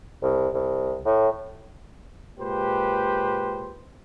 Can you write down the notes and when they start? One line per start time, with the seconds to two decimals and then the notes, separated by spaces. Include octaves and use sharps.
0.22 C2
0.54 C2
1.05 A2
2.39 A#2 G#3 G4 B4 C5